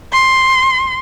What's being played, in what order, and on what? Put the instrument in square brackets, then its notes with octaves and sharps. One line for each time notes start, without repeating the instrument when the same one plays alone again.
[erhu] C6